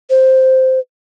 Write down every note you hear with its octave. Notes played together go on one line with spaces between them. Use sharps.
C5